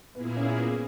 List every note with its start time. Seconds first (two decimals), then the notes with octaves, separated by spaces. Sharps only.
0.15 A#2 A#3 B3 E4 G#4
0.37 C#4
0.57 B3